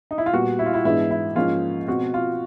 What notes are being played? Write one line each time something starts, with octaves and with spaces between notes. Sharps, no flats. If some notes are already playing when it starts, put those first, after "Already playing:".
D#4
E4
F4
A#2 G3 B3 F#4
E4
F4
E4
G#2 E3 G#3 B3 D4 E4
E4
G#2 F3 A#3 C#4 F4
B2 G#3 C4 F#4
F4